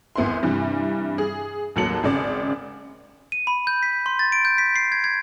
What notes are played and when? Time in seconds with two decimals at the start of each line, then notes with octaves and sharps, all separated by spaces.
0.16 G#1 E2 B3 E4 E5 C6
0.43 G2 C3 E3 G3
1.18 G#4
1.76 A1 D#2 F#3 A4 C#7 F#7
2.03 G#1 C#3 D5
3.32 D#7
3.47 B5
3.67 G6
3.83 B6
4.06 C6
4.19 A6
4.32 D7
4.45 G6
4.58 B6
4.76 C7
4.92 G#6
5.04 G#6